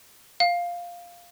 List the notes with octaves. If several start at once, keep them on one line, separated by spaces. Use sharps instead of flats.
F5